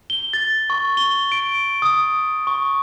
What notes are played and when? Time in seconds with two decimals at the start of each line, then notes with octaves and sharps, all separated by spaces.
0.10 G7
0.33 A6
0.70 C#6
0.97 G7
1.32 D7
1.82 D#6
2.47 C#6